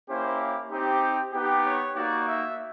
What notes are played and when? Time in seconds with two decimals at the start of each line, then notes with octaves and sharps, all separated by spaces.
0.09 A#3 C#4 E4 G4 C5
0.71 C4 D#4 G4
1.33 B3 D#4 G4
1.65 C#5
1.95 A#3 D#4 F#4 D5
2.27 E5